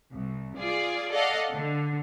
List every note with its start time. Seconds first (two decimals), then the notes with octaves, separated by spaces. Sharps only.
0.13 C2
0.58 F4 G#4 D5
1.12 A4 D5 D#5 F5 F#5
1.52 D3